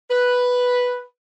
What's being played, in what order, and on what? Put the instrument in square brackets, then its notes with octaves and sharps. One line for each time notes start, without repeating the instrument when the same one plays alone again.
[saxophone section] B4